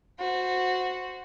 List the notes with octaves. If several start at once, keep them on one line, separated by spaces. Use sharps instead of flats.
F#4 C5